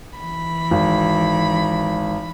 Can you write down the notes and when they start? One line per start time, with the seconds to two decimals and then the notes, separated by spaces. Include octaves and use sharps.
0.19 E3 B5
0.71 G#1